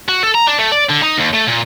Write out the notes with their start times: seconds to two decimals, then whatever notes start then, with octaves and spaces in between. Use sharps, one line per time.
0.09 F#4
0.23 A4
0.35 A#5
0.47 D4
0.59 A3
0.72 D5
0.89 D3
1.02 D#4
1.18 D#2
1.33 A3
1.47 A#2